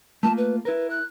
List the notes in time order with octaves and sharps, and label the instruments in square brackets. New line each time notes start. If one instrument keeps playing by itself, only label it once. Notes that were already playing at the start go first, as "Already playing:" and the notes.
[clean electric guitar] A3 A#3 F4 [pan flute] A5
[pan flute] B4
[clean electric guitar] E4 A#4 [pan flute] B4
[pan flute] F#6